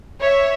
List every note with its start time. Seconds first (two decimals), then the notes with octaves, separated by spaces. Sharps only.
0.22 C#5 E5